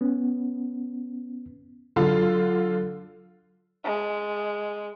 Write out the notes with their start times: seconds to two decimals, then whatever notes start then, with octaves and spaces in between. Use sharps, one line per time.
0.01 B3 C#4
1.96 D3 F#3 F4 A4
3.84 G#3